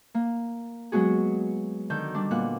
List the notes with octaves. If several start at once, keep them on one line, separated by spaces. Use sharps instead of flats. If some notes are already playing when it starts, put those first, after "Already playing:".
A#3
F#3 G#3 B3 F#4 G#4
D3 D#3 G6
G3 D4
A#2 B3 F#6